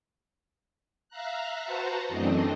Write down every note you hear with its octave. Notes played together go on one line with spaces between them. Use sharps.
E5 F5 A#5 F#6
F#4 B4 C5 F#5 A5 A#5
F#2 E3 A3 C4 D4 D#5